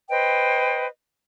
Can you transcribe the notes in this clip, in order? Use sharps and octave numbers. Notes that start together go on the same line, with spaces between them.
B4 C5 D#5 G5